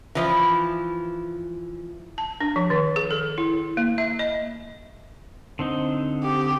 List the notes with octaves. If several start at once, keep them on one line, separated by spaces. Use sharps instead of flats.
E3 F3 E4
A5
D4
F3
D#3
G#4
A4
E4
A#3
E5
D#5
D3 C4 D#4
G4